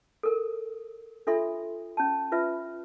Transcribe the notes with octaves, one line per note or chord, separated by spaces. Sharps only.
A4 A#4
D4 F4 A4 E5 C6
C#4 A5
F4 B4 E5